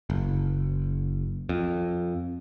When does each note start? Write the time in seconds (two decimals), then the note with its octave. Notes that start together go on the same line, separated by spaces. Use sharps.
0.10 F#1
1.49 F2